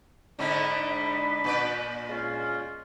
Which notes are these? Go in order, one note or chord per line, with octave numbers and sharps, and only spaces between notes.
G#2 D3 D4 D#4 D#5 B5
A#2 B4 D5
G#3 C#4 F4